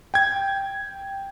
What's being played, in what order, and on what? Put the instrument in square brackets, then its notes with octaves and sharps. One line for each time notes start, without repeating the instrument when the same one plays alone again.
[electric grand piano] G5 G#6